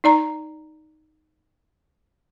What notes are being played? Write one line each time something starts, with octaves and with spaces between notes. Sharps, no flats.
D#4 D5 A#5